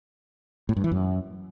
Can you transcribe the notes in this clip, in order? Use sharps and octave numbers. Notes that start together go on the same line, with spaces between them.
A2
G2
E3
F#2